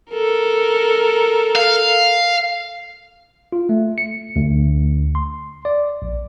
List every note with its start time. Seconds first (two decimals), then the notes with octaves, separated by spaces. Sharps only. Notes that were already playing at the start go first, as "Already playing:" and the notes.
0.12 A4 A#4
1.55 F5
3.52 F4
3.69 A3
3.98 C#7
4.36 D2
5.15 C6
5.65 D5
6.02 A#1